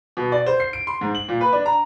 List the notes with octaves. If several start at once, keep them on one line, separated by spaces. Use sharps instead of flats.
B2
D5
C5
C7
D7
C6
G#2
F#7
A#2
B4
D4
A#5